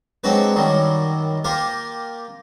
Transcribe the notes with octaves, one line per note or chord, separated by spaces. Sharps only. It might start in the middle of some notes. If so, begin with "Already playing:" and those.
F#3 G#3 C4 D4 F#4 B4
F#2 D#3 F#3 G3
A#3 F4 G4 A#4